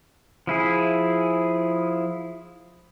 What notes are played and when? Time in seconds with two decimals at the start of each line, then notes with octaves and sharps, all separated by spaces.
0.47 F3 E4 G#4